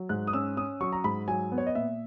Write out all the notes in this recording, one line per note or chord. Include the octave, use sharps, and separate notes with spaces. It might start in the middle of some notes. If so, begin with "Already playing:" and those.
Already playing: F#3
G#2 F#6
D#6
C#4 E6
C#4 D#6
F#3 C#6
A#5
G#2 B5
F#3 G#5
B3
C#5
D#5
A#2 E5